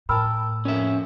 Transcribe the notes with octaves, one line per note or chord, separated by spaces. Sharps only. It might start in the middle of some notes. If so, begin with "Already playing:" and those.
A2 A#4 G5 A5 B5 E6 F6
A#1 F2 C#4 E5